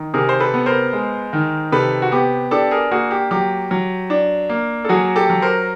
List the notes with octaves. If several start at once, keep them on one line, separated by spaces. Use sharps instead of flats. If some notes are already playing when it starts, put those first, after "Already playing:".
Already playing: D#3
C3 G#4 A#4
C5
A4 B4
B3
A#4 C5
G#3
D#3
C3 A4 B4
F#4
B3 G4
D4 G4 A4
G#4 A#4
A#3 F#4 G#4
G4
F#3 G4
F#3
D4
A#3
A4
F#3 F#4 G#4
G4 A4
F#3
A#4 C5